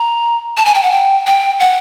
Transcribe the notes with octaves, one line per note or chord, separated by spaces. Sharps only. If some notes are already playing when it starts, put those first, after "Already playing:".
Already playing: A#5
A5
G#5
G5
F#5
G5
G5
F#5